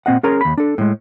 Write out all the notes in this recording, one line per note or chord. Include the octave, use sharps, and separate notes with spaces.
A#2 C4 D#5 F#5
C#4 G#4 A#4 A#5 C6
D#2 B5
D4 A4
A2 G#3